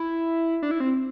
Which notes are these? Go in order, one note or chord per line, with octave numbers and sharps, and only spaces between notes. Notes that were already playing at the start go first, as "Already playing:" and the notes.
Already playing: E4
D4
E4
C4